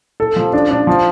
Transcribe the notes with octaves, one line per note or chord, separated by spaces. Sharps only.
A4
F3
D4
D4
F3